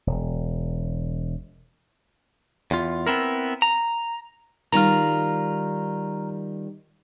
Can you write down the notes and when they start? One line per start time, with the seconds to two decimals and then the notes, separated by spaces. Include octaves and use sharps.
0.07 E1
2.71 E2 F4
3.07 B3 C4 E4 A#4
3.62 A#5
4.72 D#3 G3 F4 A#5 F6